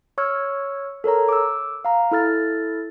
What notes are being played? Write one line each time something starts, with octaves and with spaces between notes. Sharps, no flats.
C#5 C#6 E6 F6 G#6
A4 A#4 C#5 A#5
D6 E6
F5 A#5
E4 A4 F6 A6